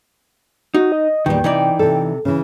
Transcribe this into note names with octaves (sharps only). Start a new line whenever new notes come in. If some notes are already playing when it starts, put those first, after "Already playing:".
D#4 F#4
D#5
E2 A#2 D#3 G3 G5
C3 E3 D#4 D5
C3 A4
C#3 E3 C#4